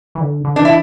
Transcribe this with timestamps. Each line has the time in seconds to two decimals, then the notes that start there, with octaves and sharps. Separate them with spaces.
0.15 E3
0.21 D3
0.45 D3
0.56 E3 D4
0.65 E4